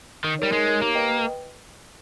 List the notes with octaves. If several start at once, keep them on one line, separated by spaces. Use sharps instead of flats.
D#3 D#4
G3 A#4 C#5
G#3 D#4
A#4 C#5
A#3 G4
B4 D#5 G5